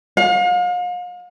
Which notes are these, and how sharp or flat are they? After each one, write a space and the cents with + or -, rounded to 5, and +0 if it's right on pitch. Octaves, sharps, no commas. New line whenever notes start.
F5 +40